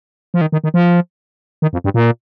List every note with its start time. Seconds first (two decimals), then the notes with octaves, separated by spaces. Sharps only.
0.34 F3
0.41 D#3
0.52 D#3
0.64 D#3
0.74 F3
1.62 D#3
1.73 F2
1.84 G2
1.94 A#2